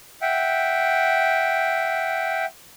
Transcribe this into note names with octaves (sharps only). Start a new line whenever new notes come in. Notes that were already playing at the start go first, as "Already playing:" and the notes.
E5 F#5 G5